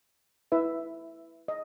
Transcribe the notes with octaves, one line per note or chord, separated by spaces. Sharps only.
E4 B4 E5
D#5